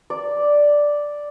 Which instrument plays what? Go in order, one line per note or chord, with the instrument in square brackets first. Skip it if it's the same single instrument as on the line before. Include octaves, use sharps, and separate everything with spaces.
[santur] D5